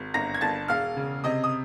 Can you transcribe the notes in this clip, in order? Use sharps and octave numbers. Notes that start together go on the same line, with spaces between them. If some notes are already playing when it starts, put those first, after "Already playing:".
Already playing: G#1
G1 A#5 A#6
G#6
G1 A5 A6
E1 F5 F6
C#3
C3 D#5 D#6
D#6